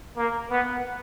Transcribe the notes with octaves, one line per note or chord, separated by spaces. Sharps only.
A#3
B3